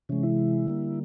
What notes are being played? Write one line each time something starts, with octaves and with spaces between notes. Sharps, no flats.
C3 E3 G#3 C#4
E4
D3 G3 A#3